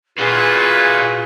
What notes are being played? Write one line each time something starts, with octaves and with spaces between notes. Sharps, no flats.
A#2 F4 F#4 G#4 B4